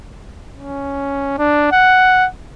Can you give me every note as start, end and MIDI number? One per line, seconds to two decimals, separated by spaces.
0.56 1.37 61
1.38 1.70 62
1.72 2.27 78